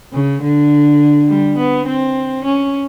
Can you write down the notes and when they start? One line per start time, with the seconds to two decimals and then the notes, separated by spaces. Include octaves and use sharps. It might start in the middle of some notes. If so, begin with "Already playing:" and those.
0.13 C#3
0.42 D3
1.28 G3
1.58 B3
1.87 C4
2.45 C#4